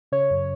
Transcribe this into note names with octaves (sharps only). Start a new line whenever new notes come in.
C#3 C#5
F#2